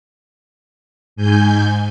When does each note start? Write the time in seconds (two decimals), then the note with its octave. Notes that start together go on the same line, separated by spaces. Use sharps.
1.16 G#2 G#5 G6